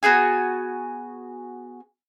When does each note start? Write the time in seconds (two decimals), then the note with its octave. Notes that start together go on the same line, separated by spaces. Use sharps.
0.03 B3 F#4 G#4 G#5